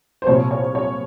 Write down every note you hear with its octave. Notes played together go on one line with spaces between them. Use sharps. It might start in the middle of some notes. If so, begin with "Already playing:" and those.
C5
C2 A#2 F3 C#5
C#5
C#5